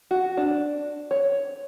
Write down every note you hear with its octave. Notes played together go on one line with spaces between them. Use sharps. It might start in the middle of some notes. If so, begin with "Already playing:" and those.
F#4
D4
C#5